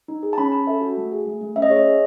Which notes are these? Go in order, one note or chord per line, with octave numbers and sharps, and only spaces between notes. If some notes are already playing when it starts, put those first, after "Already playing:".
D#4
G#4
A5
C#4 B5
C#4 A5
A4 E5
F#4
A3
G#4
A3
A3
C#4 E5
D#5
G#4 C#5
D#5
G#4